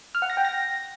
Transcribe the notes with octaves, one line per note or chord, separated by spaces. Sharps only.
F6
F#5
A#6
G5
A#6